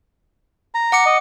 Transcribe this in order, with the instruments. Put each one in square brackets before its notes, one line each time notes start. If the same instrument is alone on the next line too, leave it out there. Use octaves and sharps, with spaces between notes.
[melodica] A#5
[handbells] F#5 D6 C#7
[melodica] D#5